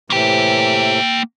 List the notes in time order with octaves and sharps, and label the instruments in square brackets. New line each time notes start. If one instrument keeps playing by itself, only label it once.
[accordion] A2 C3 E3 [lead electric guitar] A#3 G5